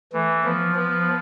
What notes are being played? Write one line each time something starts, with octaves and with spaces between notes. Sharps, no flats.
E3 A3
F3 B3
F3 B3